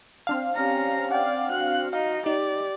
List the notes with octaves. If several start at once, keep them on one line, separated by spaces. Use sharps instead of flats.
C4 D4 F5
C#4 G4 A#5
D5 F#5 G5
F#4 F#6
D#4 F5
D#4 G4 D5